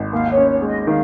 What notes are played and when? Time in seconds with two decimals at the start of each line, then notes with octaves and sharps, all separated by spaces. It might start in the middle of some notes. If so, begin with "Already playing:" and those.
Already playing: G#1
0.12 D#2 F5
0.32 C#5
0.37 C#4
0.49 C#5
0.62 G#3
0.68 D#5
0.87 D#3 F5